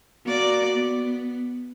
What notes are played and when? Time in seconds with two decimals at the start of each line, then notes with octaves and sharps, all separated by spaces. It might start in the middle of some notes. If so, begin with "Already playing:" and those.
0.25 A#3 F#4 D5
0.72 B3